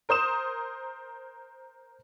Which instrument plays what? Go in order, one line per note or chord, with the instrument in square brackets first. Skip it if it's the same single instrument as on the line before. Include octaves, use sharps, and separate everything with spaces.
[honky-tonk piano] A#4 C5 D#6 E7